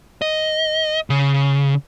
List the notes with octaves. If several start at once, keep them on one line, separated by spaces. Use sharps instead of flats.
D#5
C#3